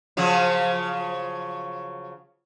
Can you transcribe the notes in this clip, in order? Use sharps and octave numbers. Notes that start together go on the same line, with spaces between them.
C#3 F3 F#3